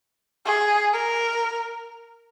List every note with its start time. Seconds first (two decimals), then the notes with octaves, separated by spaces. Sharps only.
0.46 G#4
0.93 A#4